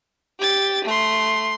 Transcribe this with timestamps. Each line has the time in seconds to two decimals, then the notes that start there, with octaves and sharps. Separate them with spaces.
0.40 G4 A6
0.84 A3 C6